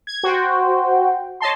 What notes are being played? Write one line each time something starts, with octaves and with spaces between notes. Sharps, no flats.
G#6
F#4 C5 G5
C#5 D#5 A5 C6